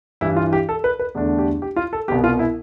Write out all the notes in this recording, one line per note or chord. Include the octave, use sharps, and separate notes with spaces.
G2 E3 G3 E4
F4
G4
A4
B4
B4
E2 D3 A3 D4
G4
G4
F4
A4
C2 B2 B3 G4
F4
E4